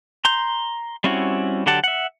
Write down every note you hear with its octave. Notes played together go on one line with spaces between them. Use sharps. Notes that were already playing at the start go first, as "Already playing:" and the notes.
A#5 C6 G6
G3 C4 C#4 E4 F#4
D3 F#3 G4 F#5 A5
E5 F#5